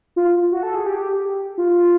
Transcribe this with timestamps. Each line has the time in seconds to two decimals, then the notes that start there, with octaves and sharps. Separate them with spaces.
0.16 F4
0.52 F#4
0.63 A4
0.75 G#4
0.86 G4
1.58 F4